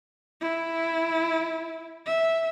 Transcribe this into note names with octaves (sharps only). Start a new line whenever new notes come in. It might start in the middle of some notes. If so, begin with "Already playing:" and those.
E4
E5